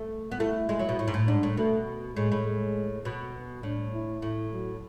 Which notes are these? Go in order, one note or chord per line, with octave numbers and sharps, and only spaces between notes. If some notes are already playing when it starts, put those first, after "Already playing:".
Already playing: A3
B3
A3 E4
G#3
F#3
B2
A2
G#2
A2
G#2 D4
A2
B2 A3
A2 G#3
A2
G#3
B2
B3
A2 D4
E4
A2 E4
F#3